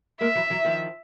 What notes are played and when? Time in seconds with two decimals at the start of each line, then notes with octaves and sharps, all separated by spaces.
0.21 G#3 A#3 E5
0.35 E3 F#3
0.50 E3 F#3
0.65 D#3 F3